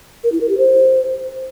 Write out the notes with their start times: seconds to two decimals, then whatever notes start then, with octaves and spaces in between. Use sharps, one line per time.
0.24 A#4
0.32 E4
0.41 A#4
0.49 G4
0.58 C5